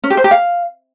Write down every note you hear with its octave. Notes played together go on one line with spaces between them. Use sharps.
C#4
G4
C5
G4
F5